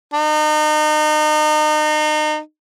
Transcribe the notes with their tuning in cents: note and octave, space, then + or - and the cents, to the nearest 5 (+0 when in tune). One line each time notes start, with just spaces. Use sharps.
D#4 -35